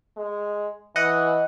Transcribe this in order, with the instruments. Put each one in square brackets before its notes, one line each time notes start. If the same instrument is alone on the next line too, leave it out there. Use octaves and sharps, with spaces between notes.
[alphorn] G#3
[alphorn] E3 [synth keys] D#5 F#5